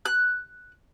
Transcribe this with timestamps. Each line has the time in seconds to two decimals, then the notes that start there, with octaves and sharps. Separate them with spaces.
0.06 F#6